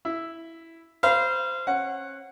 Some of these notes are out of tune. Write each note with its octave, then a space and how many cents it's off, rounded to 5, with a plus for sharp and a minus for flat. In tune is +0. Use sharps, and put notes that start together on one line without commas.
E4 +0 E5 +0
C5 -15 F5 -25 B5 -30
C#4 -30 F#5 +0